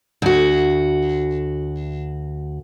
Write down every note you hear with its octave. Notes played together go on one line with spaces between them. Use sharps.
D2 F#4